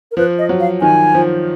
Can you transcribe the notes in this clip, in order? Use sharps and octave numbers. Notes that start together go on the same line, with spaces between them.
A#4
F3 B4
D#5
F#3
F5
D#3 G#5
F3